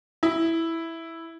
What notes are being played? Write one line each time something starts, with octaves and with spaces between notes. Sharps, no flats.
E4